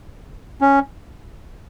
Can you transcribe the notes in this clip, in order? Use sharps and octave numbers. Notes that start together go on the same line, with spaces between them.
C#4